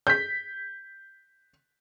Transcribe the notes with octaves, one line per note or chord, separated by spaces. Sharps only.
G6 B6